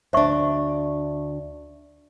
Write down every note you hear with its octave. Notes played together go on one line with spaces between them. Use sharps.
D2 D4 C5 E5 C#6